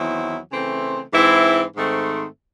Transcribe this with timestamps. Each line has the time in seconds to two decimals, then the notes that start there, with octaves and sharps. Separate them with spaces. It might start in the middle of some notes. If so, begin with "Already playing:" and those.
Already playing: E2 D#3 F#3 C4 E4
0.51 C#3 E3 A3 C4
1.13 G#2 E3 C4 E4
1.75 G#2 D#3 A3 C4